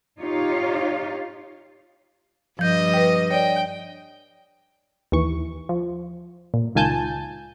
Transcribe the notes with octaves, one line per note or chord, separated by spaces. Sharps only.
D#4 F4 G4 C#5 F5
G2 F3 D#5 G6
B4 G5
C#5 D5 G5
D#2 E3 C#6
F3
A#2
C#2 D#3 F4 G#5 A5 G6